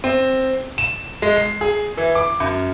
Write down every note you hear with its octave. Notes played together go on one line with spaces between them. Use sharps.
C4
E7
G#3
C7
G#4
E3
D6
F#2